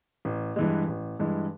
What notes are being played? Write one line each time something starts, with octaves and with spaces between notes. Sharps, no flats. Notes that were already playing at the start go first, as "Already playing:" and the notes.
A1
G2 E3 G#3
A1
G2 E3 G#3